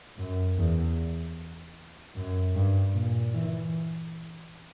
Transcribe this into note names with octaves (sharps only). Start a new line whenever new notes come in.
F#2
E2
F#2
G2
A#2
E3